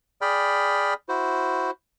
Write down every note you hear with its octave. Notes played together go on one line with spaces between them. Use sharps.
G#4 D5 G5 B5 F6
E4 F#4 C5